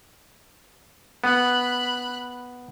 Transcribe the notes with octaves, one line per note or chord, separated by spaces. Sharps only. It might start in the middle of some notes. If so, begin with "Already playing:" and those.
B3 B5 F#6